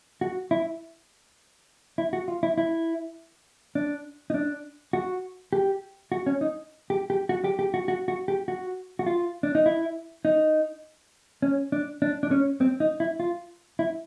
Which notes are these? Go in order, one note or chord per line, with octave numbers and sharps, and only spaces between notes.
F#4
E4
E4
F#4
F4
E4
E4
D4
D#4
D4
F#4
G4
F#4
C#4
D#4
G4
G4
F#4
G4
G4
F#4
F#4
F#4
G4
F#4
F#4
F4
D4
D#4
E4
D#4
C#4
D4
D4
D4
C#4
C4
D#4
E4
F4
E4